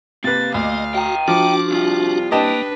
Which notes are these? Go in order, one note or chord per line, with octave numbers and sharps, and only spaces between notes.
C3 A#3 B4 A6
D2 D#5 F5
F#4 G5 A#5
F3 D4 F#4 D6
C2 F4
A#3 D4 G4 B4 D#5 A5